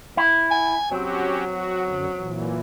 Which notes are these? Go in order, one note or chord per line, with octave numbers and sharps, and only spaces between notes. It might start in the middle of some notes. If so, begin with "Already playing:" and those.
E4
G#5
F#3 C4 C#4 F#4 G4
F#4
F#2 D3
A#2 E3